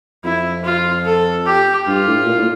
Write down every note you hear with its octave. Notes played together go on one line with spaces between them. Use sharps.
F2 E4
F4
A4
G4
G2 F4
A2
A#2
A2